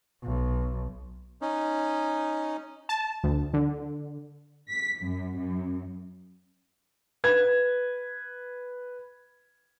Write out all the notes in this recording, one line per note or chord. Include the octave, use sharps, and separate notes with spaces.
B1
C#4 D#4
A5
D2
D3
B6
F#2
F#2
B4 G#6